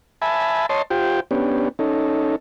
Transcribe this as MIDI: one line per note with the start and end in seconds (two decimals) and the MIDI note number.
0.22 0.66 76
0.22 0.66 80
0.22 0.66 81
0.22 0.66 83
0.69 0.82 73
0.69 0.82 75
0.69 0.82 81
0.69 0.82 84
0.90 1.20 65
0.90 1.20 67
0.90 1.20 72
0.90 1.20 79
1.31 1.69 59
1.31 1.69 61
1.31 1.69 62
1.31 1.69 67
1.79 2.36 61
1.79 2.36 63
1.79 2.36 69